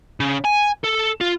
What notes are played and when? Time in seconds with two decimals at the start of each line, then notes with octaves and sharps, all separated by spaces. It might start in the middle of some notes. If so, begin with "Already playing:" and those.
0.20 C#3
0.44 G#5
0.84 A4
1.20 F4